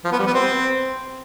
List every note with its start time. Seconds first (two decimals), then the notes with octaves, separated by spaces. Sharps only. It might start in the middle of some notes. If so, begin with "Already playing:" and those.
0.05 F3
0.12 B3
0.19 G3
0.27 B3
0.34 C4